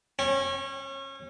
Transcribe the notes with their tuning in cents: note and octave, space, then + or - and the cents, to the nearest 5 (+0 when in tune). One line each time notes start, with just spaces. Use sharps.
C#4 -30